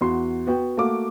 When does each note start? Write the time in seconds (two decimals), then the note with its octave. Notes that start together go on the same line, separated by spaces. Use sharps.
0.01 E2 F#4 C6
0.47 B3 F#4 G5
0.77 A3 A#3 F#4 D6